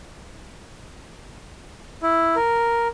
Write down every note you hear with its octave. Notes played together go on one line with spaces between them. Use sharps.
E4
A#4